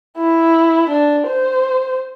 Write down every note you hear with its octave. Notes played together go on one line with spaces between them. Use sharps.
E4
D4
C5